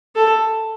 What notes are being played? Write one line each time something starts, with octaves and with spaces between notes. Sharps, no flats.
A4